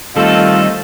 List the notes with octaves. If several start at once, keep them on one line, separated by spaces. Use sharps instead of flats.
D#3 G3 A3 C4 F4 A4 D#5